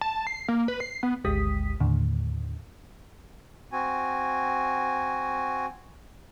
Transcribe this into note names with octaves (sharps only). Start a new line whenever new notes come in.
A5
C7
A#3
B4
C7
B3
G#1 D2 G#3 G4 D#6 B6
D#2 A2 D3
C4 F#4 G#5